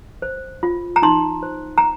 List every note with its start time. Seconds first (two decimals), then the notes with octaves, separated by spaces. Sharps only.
0.22 C5
0.63 F4
0.96 A#5
1.02 D#4 C6
1.43 C5
1.78 A#5